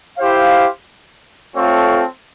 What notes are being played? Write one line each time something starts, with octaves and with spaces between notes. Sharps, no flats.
E4 G4 C5 F5
A3 C4 F4 A4 C#5